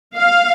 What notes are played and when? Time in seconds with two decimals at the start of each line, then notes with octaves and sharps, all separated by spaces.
0.15 F5